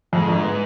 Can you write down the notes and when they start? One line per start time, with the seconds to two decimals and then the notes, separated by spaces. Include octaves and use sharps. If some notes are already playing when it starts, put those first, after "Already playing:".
0.13 F2 G#2
0.28 G1
0.44 B3